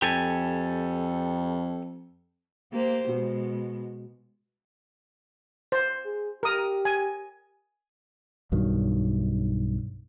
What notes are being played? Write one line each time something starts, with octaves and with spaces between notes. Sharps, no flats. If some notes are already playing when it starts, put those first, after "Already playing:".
F2 G4 A4 G#5
A#3 G4 C5
B2 G#3
C5
G#4
G4 A#4 D#6
G#5
B1 G2 D#3 F#3